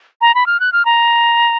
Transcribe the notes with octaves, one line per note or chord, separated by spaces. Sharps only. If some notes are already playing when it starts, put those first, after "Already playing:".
A#5
B5
F6
F#6
F6
A#5